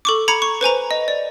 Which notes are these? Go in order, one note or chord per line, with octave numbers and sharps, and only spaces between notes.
A4 C#6 D6
A#5 B5 G#6 C#7
C#6
B4 C5 G#5 A#5
D#5
D5